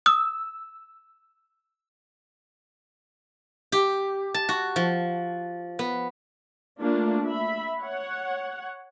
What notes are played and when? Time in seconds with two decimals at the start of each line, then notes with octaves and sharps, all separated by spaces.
0.06 D#6 E6
3.72 G4
4.34 A5
4.49 F#4
4.76 F3
5.79 B3
6.80 A3 A#3 D4 F4
7.26 E5 B5
7.80 C#5 F#5